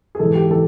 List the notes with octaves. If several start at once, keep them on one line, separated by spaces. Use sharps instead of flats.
G#4
G#2 E3 A4
G4
E3 A4